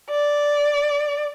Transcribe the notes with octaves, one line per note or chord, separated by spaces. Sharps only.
D5